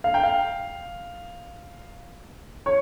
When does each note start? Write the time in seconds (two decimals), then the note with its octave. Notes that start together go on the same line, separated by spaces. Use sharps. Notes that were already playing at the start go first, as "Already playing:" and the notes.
0.04 F5
0.14 G5
0.23 F5
2.66 C#5